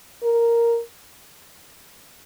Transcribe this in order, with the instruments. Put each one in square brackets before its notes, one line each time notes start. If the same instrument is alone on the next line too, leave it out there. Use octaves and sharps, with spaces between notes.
[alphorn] A#4